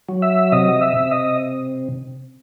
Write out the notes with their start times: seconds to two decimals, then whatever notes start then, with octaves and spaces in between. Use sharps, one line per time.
0.09 F#3
0.22 E5
0.52 C3 D#5
0.81 E5
0.97 C3
1.11 D#5